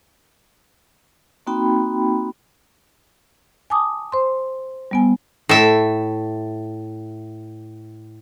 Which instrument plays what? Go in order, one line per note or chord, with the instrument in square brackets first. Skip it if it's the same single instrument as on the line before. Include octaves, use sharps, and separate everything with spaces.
[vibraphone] A#3 C4 D#4 F#4 G5 B5
[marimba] G#5 A5 D6 D#6
C5 C6
G3 B3 G#5
[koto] A2 E5